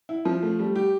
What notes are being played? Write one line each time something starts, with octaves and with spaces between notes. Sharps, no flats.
E4
F3
A3
G3
G4